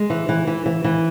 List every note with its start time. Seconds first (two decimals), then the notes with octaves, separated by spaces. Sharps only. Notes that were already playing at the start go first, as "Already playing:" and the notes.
Already playing: G#3
0.10 E3
0.29 E3
0.47 E3
0.66 E3
0.84 E3